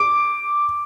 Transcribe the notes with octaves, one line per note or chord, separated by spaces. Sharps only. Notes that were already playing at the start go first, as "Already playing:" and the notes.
Already playing: D6